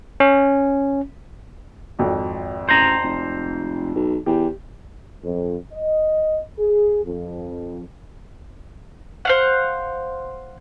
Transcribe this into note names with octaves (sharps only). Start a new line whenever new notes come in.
C#4
G#1 F2 F#4
A1 C5 A#5
F1
B1
E2 G4
F2
D#5
G#4
F2
C5 F5 F#5